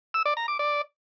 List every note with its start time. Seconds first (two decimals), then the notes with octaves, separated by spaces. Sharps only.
0.14 E6
0.26 D5
0.37 A#5
0.48 D6
0.59 D5